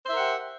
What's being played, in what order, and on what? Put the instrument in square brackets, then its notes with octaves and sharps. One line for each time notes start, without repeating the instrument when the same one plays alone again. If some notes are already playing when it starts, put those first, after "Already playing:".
[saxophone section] C5
E5
A#4
F#5
G4